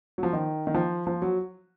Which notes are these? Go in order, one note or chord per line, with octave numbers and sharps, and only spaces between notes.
F#3
F3
D#3
D#3
F3
F3
F#3